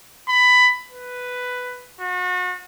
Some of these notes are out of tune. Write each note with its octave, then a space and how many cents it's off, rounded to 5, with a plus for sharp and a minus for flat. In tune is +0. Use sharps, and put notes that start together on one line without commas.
B5 +15
B4 +5
F#4 -35